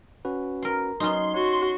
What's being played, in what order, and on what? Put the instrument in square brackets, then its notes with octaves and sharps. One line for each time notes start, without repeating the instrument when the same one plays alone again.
[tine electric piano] C#4 F#4 B4
[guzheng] A#4 C6
[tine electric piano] F#3 [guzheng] B3 C#4 D#4 [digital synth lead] C6
[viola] F#4 [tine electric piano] C#5